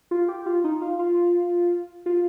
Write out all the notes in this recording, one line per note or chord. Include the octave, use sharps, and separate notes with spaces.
F4
G4
F4
D#4
F4
F4
F4